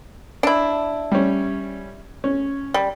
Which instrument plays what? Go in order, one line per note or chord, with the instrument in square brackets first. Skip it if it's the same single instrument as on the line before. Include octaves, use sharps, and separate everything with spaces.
[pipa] D4 E4
[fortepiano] G3 C#4
C#4
[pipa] G3